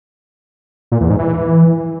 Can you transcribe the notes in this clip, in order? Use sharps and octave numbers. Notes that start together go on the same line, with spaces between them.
A#2
E2
G#2
E3